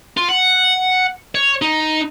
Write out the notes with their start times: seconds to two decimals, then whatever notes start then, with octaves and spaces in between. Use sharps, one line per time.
0.17 F4
0.29 F#5
1.35 C#5
1.62 D#4